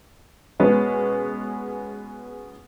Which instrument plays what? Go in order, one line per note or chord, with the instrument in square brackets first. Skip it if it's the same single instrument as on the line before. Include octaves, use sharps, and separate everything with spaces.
[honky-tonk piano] B2 G#3 B3 C#4